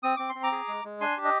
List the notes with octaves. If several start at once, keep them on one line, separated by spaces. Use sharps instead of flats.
C4 D#6
C4 D6
C6
C4
A#5 D6
G#4
G#3
G#3
D4 G#5 C6
G4
D#5